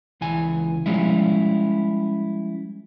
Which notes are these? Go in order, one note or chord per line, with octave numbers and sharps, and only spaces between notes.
C#2 E3 G#5
F3 G3 G#3 C#4 E4